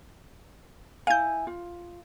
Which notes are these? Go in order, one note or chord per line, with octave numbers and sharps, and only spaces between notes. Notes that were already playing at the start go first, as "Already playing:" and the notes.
E4 F5 G#5 G6
F4